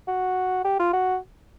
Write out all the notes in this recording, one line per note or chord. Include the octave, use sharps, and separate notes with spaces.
F#4
G4
F4
F#4